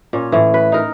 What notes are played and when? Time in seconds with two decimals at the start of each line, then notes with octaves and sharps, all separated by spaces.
0.13 A#2 C#4
0.32 A2 E3
0.54 B4
0.72 D#4 A#4